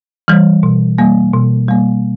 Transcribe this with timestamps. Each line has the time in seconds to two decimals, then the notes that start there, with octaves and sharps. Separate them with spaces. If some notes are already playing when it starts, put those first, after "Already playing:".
0.28 E3 G3
0.63 B2
0.98 G3 A#3
1.34 B2
1.68 G3 A#3